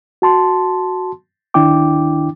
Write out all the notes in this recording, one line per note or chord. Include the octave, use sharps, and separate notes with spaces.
F#4 A5 C6
D2 D#3 D4 E4 G5 D6